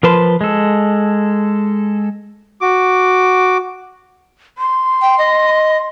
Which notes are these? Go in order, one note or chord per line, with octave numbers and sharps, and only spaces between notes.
F3 A#4 B4 A5 C6
G#3 A4
F#4 D6
C6
G5
D#5